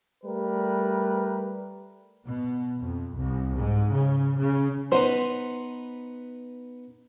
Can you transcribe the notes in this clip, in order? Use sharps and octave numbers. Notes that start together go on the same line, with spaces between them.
G3 A3 A#4 B4
B2
F2
C2
G#2
C#3
C#3
B3 D#4 B4 C5